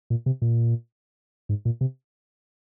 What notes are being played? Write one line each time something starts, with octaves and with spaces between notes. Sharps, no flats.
A#2
C3
A#2
G#2
A#2
C3